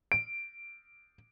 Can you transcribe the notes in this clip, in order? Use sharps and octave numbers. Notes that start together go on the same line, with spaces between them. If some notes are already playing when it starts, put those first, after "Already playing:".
D7